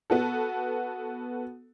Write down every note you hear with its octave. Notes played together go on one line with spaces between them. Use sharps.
B3 F#4 A4